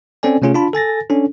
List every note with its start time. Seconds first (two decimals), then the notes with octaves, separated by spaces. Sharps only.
0.23 C4 C#4 A4 D5 G#5
0.42 C3 A3 C#4 F4 G#4
0.54 D4 F4 A5 B5
0.73 A4 G#5 A6 A#6
1.10 C#4 D4 A4